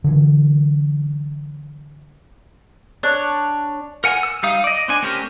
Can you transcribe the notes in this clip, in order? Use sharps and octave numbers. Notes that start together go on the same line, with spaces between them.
D3 E3 F#3
D4 C#5 F#6
A#4 F#5 G#5
E6
G3 D#4 F5 D#6
D5 D#5
C4 D4 G#5
A3 C4 C#4 G4 A#4